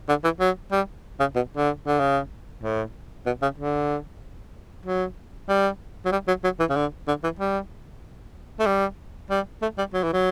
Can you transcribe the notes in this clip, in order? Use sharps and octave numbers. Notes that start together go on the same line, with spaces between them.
D3
E3
F#3
G3
C#3
B2
D3
D3
C#3
A2
B2
C#3
D3
F#3
G3
F#3
G3
F#3
F#3
E3
C#3
D3
D3
E3
G3
A3
G3
G3
A3
G3
F#3
E3
F#3